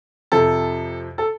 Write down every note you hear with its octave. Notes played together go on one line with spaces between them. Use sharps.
F2 C3 F3 A4
A4